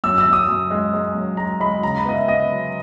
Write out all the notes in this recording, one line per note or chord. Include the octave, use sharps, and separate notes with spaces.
F#2 E6
E6
F#2
D#6
F#2
G#3
G#3
F#2
G#3 A#5
G#3 B5
C#3 A#5
B5
B3 D#5
E5
B3 D#5
F#3